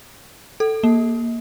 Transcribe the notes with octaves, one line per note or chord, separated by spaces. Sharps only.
A4
A#3